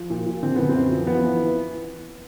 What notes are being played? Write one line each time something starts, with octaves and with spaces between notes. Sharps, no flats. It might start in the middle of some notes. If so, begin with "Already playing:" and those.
Already playing: F3
A#2
A#2
D3 C4
F#2 B3
C4
F#2
F3
E3 B3
E3